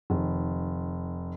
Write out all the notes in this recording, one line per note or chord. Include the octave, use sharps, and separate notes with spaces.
F1 D#3